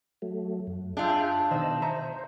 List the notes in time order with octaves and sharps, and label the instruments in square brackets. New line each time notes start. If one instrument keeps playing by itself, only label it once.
[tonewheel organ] F#3 A3
F#2
[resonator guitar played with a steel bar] D4 F4 [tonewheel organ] G#4 E5 G5
[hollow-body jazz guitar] B2 D#3 [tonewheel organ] C5 D#5 E6
[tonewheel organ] C5 [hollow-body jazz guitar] E5 A#5